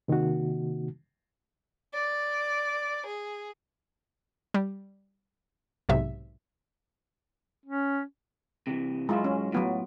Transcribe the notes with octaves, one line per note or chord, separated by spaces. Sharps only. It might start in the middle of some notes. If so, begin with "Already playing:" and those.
C3 D#3 A#3 D#4 F#4
D5
G#4
G3
B1 G#2 C3 E5
C#4
C3 E3
G#2 F#3 G#3 E4 F4
C#4
A2 F#3 B3 F4